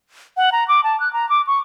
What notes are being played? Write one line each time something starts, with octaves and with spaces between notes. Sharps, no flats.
F#5
A#5
D6
A5
F#6
A#5
D6
C#6